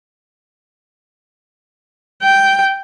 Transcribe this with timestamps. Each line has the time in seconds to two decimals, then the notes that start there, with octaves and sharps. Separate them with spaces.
2.22 G5